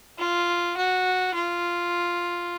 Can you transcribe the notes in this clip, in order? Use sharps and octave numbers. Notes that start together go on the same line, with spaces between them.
F4
F#4
F4